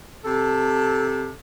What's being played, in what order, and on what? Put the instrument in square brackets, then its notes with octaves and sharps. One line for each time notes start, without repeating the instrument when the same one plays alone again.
[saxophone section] C3 A4